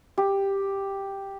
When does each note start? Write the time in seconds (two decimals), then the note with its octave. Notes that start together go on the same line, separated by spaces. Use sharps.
0.18 G4